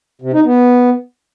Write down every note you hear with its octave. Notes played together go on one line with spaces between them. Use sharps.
C3
D#4
B3